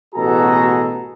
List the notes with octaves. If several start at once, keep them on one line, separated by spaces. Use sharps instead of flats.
A1 B2 F#4 G#4 A4 A#5